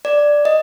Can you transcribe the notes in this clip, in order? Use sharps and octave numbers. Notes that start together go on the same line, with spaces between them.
D5
D#5